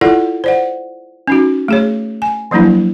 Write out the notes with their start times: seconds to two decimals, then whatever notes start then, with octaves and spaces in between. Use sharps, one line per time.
0.01 E4 F4 A4 A#4 D5 F#5
0.44 C5 D5 F#5
1.27 C#4 D#4 F#4
1.68 A3 G#4 C#5
2.22 G#5
2.51 F3 F#3 A#3 D4 E4